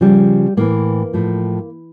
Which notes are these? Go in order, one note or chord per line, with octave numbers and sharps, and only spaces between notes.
C#3 F3 G3
A2 E3 A#3
A2 F3